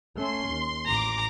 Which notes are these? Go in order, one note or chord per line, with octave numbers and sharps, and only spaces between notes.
A3 C#4 C6
D#2
A1 A#5 D6